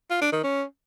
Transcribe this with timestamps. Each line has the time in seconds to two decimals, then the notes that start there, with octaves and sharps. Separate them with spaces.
0.10 F4
0.21 D4
0.33 D#3
0.44 C#4